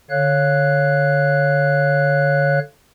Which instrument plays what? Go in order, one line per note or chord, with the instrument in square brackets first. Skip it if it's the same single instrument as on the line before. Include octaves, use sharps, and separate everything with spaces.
[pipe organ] D3 C#5 F5 F#6